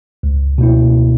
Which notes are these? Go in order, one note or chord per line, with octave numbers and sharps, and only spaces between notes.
C#2
B2 A#3 E4